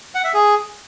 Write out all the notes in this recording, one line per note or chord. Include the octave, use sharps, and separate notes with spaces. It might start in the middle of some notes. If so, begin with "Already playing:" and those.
F#5
E5
G#4